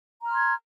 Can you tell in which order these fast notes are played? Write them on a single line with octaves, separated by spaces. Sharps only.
A#5 F6 C6 G#6